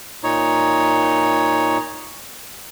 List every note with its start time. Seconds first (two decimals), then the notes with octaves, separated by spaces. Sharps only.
0.24 A#2 D#4 C#5